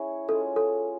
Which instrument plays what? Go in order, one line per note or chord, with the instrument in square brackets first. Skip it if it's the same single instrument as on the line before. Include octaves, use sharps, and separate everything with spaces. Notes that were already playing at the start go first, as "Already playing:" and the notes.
Already playing: [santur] C#4 E4 G#4 C#5
[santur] G#3 C#4 F4 G#4 [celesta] A4
[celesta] A4